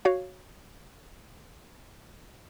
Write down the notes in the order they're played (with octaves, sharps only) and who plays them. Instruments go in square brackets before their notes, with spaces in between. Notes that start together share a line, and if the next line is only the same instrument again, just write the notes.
[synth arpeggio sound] F#4 C#5 F5